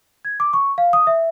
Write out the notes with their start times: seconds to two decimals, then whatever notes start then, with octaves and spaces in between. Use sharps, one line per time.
0.25 G#6
0.40 D6
0.53 C#6
0.78 F5
0.93 D#6
1.07 E5